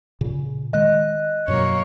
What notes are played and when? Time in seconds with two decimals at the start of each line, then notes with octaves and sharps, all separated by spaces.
0.21 A#2 C#3
0.73 D#3 G#3 D#5 F#6
1.48 F#2 B2 F#3 A#3 C#5